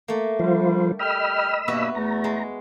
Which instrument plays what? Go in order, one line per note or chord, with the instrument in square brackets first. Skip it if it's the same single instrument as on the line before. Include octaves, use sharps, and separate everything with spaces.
[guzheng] A3 A#3
[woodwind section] D3 G3 [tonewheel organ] F3 F4 C5
[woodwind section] G3 G5 F6 [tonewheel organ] D#5 B5 E6
[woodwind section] G2 B2 A#3 [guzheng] B3 F#4 E5
[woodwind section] E2 A3 [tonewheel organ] A#5
[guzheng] G#3